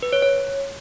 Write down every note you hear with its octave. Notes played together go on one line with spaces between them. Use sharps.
B4
C#5
C#5